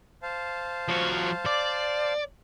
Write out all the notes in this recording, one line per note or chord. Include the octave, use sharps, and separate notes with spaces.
C5 F5 A5
F3 F#4
D5